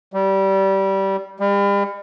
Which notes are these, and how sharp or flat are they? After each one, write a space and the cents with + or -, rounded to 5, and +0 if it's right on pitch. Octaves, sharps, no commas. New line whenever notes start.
G3 -20
G3 +40